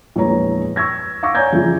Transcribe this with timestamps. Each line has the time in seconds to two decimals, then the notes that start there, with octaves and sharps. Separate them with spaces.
0.16 A#1 E2 G#3 B4 C#5 A#5
0.76 C#6 E6 G#6 A#6
1.23 F5 F#5 C#6 D6 E6 A#6
1.35 C#5 D5 G#5 A#5 G6 G#6
1.52 F2 C#3 E3 F3